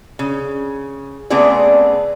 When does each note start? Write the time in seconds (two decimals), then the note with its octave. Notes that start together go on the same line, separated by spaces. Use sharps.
0.19 C#3
1.30 C#3 A3 B3 C4 G#4 D5